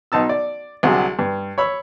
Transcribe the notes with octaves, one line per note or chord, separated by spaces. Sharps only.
B1 D#4 A5 E6
D5
C2 D3 F#3 G#4
G2
C#5 B5 E6